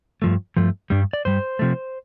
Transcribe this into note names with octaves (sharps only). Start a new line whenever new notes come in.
G2 F3 A3
G2 F3 A3
G2 G3 D4
D5
G2 G3 C5
C3 F3 A3